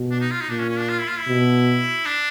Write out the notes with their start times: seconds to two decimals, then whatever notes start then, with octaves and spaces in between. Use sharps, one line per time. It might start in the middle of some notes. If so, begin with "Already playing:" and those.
Already playing: B2
0.11 D4
0.20 D#4
0.31 F4
0.41 D#4
0.50 A#2 D4
0.60 C#4
0.70 C#4
0.79 D4
0.89 F4
0.99 E4
1.08 F4
1.19 E4
1.28 B2
2.06 D4